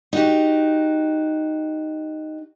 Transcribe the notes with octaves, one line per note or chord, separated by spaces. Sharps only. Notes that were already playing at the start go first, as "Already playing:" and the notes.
D#4 F#4 G4